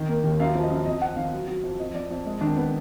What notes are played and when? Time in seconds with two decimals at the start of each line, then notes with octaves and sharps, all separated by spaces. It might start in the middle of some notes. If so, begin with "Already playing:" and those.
Already playing: D#3
0.09 A#3
0.24 D#2
0.40 F#2 F5
0.55 F3
0.63 D#5
0.70 F#2
0.85 F2 D#5
1.01 F2 F#5
1.17 D#3 F5
1.33 F#3
1.48 F#3
1.64 F2
1.79 F2 D#5
1.94 F2 D5
2.11 F2
2.27 G#3
2.41 D#3 D4
2.57 B3